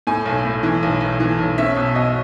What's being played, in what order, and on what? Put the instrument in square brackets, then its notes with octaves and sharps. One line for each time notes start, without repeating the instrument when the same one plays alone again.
[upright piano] A2 G#5
B1
A2
E3
B1
B1
E3
B1
C#4 E5
B2
B2 D#5